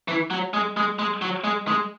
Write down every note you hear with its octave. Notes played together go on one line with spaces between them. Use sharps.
E3
F#3
G#3
G#3
G#3
F#3
G#3
G#3